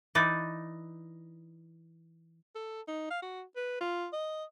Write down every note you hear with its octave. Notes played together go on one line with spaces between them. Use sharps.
E3 D#4 D5
A4
D#4
F5
F#4
B4
F4
D#5